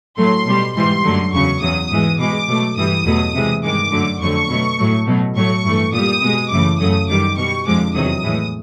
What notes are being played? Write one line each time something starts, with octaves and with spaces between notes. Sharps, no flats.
A2 F#3 A3 C6
B2 G3
G#2 E3 G3 C6
F#2 D3 F#3 A3
E2 C#3 F#3 C#6
E2 C#3 F#3 D#6
G#2 E3 G#3
B2 G#3 D6
B2 F#3 A3
G2 E3 G3 D#6
E2 B2 F#3 A3
C3 E3 G#3
G2 D#3 G#3 D6
F#2 D3 F#3 A3
F2 D3 F#3 A3 C#6
B2 F#3 A3
A2 F#3 A3
B2 F#3 A3
A2 F#3 A3 C#6
G2 E3 A3
A#2 G3 D#6
B2 G#3
F#2 C#3 E3 A3 D6
F#2 C#3 F#3 A3 D#6
F#2 D#3 G3 D6
B2 G3 C#6
F2 D3 F3 G#3 D6
E2 C3 D#3 F#3 D#6
A2 E3 G#3